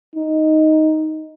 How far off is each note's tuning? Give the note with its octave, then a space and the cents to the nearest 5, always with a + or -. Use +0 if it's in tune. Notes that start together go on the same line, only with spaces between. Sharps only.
D#4 +5